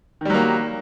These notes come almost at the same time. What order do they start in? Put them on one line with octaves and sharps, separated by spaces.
D#3 G3 F#3 A#3